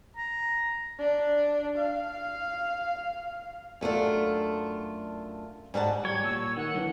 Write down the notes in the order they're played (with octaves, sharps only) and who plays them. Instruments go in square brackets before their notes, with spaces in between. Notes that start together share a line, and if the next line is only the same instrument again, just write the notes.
[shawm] A#5
[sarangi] D4
F5
[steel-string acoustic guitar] F#2 A3 D4 F4
G#2 G3 F#4 A5
[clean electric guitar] G3 [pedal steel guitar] C#5 [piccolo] G#6
[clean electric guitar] A#2 [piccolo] E6
[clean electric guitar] D#3 [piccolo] F#5
[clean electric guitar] F#2 D3 E3